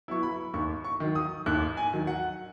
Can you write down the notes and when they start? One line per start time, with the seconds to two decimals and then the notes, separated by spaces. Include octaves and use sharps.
0.08 F#3 B3 E4 C#6
0.23 B5
0.54 D#2 C#6
0.84 C#6
1.00 D#3 F#3
1.15 D#6
1.46 D#2 F#6
1.77 G#5
1.93 D#3 F#3
2.07 F#5